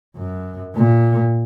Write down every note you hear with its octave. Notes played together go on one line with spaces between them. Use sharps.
F#2
A#2